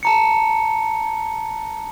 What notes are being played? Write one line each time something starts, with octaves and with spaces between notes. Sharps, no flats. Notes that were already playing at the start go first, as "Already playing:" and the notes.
A5 A#5 C#7